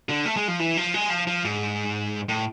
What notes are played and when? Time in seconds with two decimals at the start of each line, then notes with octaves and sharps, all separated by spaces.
0.09 D3
0.26 A3
0.36 G#3
0.48 F3
0.59 E3
0.77 F3
0.94 G#3
1.10 F3
1.27 F3
1.45 G#2
2.29 A2